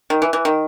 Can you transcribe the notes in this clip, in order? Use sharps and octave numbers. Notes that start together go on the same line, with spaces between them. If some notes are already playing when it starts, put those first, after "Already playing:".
D#3
E3
E3
D#3